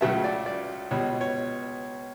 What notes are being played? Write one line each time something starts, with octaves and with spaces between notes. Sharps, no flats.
C#2 C#3 F#3 A3 E5
D5
D5
C#2 B2 G3 C#5
C#5